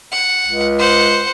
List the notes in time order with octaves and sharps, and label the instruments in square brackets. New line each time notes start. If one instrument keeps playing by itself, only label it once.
[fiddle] F#5
[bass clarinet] C#2
[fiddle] C5 F#5